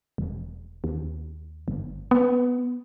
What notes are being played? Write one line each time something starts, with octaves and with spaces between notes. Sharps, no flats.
E1
D#2
G1
B3